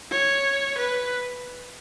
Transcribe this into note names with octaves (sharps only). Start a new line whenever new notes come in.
C#5
B4